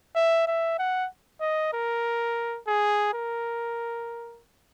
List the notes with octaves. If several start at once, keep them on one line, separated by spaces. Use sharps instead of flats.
E5
E5
F#5
D#5
A#4
G#4
A#4